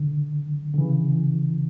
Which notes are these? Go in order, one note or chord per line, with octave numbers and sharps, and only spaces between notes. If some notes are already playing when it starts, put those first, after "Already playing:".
Already playing: D3
D3
C#3 E3